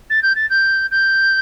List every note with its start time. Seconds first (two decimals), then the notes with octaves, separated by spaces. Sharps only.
0.10 A6
0.22 G6
0.35 A6
0.50 G6
0.91 G6